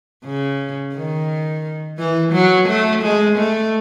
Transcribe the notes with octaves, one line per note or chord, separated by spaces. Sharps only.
C#3
D#3
E3
F#3
A3
G#3
A3